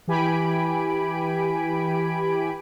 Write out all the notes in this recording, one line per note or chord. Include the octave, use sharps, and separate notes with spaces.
E3 G4 G#5 B5 D7